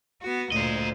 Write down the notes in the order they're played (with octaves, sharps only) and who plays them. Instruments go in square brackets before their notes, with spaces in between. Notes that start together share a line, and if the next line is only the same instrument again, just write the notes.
[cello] B3 F#4
[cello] D2 A#2 [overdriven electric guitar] C5 D#5